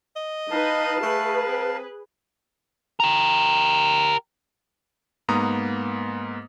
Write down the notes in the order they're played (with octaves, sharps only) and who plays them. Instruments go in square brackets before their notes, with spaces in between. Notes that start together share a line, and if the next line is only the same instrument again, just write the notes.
[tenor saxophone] D#5
[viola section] D#4 B4 [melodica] F5 A5
[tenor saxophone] A3 [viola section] G#4 B4
[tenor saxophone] C4
[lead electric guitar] G4 A#4
[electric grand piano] G#2 A#3 B3 A#5 D#6